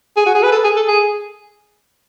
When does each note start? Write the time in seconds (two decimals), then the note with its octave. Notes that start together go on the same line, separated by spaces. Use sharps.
0.17 G#4
0.26 F#4
0.35 G#4
0.43 B4
0.52 A4
0.64 G#4
0.77 A4
0.88 G#4